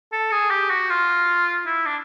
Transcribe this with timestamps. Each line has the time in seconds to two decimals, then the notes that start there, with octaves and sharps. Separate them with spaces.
0.12 A4
0.32 G#4
0.50 G4
0.70 F#4
0.90 F4
1.67 E4
1.86 D4